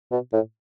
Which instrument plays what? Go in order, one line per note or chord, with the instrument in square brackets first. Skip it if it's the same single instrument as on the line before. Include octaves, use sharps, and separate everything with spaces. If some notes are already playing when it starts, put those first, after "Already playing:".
[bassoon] B2
A2